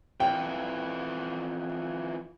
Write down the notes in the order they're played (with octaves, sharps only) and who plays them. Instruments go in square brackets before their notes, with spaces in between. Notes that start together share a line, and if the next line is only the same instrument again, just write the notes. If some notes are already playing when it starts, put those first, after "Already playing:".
[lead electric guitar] F2 E3 [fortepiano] G5